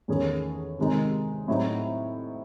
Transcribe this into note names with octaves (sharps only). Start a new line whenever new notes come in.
E2 D#3 A3 C#4 G#4
C3 D#3 G#3 D#4
A2 F#3 C4 D#4